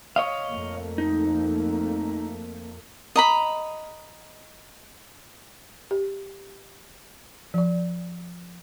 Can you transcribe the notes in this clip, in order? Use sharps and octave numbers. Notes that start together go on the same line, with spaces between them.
C#5 D#5 F5
F2 A3 A#3
D#4
D#5 A#5 B5
G4
F3 D5